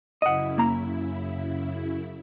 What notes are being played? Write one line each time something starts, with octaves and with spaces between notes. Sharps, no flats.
F#2 C#3 E4 D#5 F#5
A#3 A#5